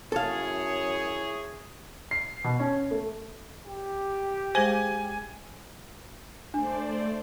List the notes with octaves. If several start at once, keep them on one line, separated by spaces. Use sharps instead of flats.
F#2 E4 G#4 A4 C#5 F5
C7
B2
C#4
A3
G4
G#3 G#4 C5 G#5
A3 D4 C5 D5